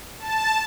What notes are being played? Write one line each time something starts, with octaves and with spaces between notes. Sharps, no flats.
A5